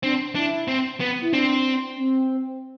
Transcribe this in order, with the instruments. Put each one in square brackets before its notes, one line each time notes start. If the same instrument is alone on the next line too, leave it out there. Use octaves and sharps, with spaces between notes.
[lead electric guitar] C4 [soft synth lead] D4
[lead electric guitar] D4 [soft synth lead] E4
[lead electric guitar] C4
B3
[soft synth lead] E4
[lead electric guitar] C4 [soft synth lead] D4
[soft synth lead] C4